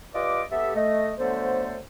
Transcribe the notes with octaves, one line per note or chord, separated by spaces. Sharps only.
F4 G4 B4 D5 D#5 D6
B3 G4 A4 E5
A3 D#5
D3 F#3 A3 B3 A4 C5